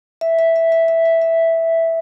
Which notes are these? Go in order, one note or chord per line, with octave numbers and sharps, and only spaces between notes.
E5
E5
E5
E5
E5
E5
E5